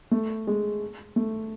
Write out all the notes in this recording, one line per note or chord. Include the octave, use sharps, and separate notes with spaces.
A3
G#3
A3